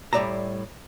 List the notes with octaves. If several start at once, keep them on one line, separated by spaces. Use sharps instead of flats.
A2 G3 A#3 D5 E5 A#5